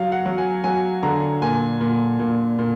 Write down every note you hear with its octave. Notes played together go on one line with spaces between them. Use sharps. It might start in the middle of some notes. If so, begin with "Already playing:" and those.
Already playing: F#3 F5
F#5
F#3
G#5
F#3 G#5
D3 A#5
A#2 G#5
A#2
A#2
A#2